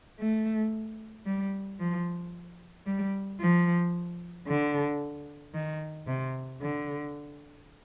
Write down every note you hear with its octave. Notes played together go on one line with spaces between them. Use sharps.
A3
G3
F3
G3
F3
D3
D#3
C3
D3